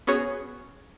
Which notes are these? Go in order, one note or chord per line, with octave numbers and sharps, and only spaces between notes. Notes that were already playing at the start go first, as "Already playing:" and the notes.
B3 C#4 F#4 G#4 C#5